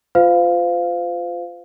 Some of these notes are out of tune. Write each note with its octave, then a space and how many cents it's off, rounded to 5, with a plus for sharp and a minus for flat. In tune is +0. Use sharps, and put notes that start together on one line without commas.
F4 +0 C5 -35 F5 +0